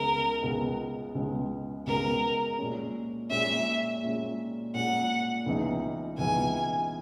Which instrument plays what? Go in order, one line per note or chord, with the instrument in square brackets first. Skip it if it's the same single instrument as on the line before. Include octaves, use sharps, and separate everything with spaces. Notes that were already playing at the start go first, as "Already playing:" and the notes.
Already playing: [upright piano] C#2 C#3 G#3 B3 [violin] A#4
[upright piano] C#2 C#3 G#3 B3
C#2 C#3 G#3 B3
[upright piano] C#2 C#3 G#3 B3 [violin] A#4
[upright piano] A#2 G#3 C#4
[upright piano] A#2 G#3 C#4 [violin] E5
[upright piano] A#2 G#3 C#4
[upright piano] A#2 G#3 C#4 [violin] F#5
[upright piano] C#2 C#3 E3 B3 D#4
[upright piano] C#2 C#3 E3 B3 D#4 [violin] G#5